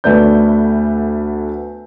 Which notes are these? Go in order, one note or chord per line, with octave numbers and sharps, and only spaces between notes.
D2 A3 B3 D5 G6